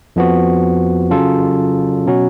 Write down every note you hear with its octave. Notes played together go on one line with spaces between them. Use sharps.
F2 F3 B3 F#4
C#3 F#3 C#4 F4 A4
B2 F#3 C#4 F#4